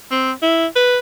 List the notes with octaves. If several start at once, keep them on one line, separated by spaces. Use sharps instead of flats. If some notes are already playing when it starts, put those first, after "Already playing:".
C4
E4
B4